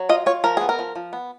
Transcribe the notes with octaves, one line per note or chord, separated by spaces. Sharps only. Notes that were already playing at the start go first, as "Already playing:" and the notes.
Already playing: F#3
F4 D#5
F4 C#5
F3 A#4
B3 G#4
A#4
F3
F3
B3